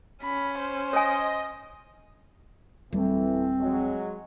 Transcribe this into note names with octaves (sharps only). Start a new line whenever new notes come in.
C#4 B5
C5
C#5 D#5 G#5
D1 E3 G3 A3 C4
F#3 G#3